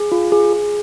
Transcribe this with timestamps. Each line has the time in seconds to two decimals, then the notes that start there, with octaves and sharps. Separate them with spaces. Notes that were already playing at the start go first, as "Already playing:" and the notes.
Already playing: G#4
0.12 F4
0.32 G#4
0.53 G#4